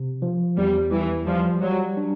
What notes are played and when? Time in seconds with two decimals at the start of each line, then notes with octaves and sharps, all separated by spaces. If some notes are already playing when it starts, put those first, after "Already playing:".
Already playing: C3
0.22 F3
0.57 E2 G3
0.92 E3 G3
1.27 F3 G3
1.62 F#3 G3
1.97 D4